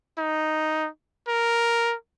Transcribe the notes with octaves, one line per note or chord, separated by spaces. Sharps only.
D#4
A#4